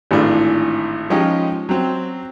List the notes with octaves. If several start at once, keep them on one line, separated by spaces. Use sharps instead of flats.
G#1 A2 E3 D4 F4
F3 G#3 C#4 D#4 F4 G4
F#3 C4